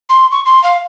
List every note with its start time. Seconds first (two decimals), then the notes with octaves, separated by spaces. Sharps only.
0.09 C6
0.32 C#6
0.46 C6
0.63 F5